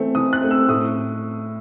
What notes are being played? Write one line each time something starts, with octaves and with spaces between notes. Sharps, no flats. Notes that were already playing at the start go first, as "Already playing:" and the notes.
Already playing: E3 A3 C4
E3 D#6
F#6
A3 C4
E6
A2 D#6